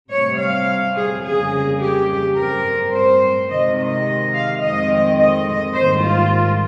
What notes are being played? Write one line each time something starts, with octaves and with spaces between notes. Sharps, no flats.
C3 G3 C4 C#5
F5
G#4
F2 C#3 G3 A#3 G#4
G4
G2 G3 C4 A#4
C5
C3 D#3 G#3 C4 D#5
D#5
F5
F2 D#3 G#3 C4 D#5
D#5
G#2 D#3 G3 A#3 C5
F4